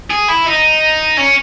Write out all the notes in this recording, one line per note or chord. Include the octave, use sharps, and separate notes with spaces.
G#4
E4
D#4
C#4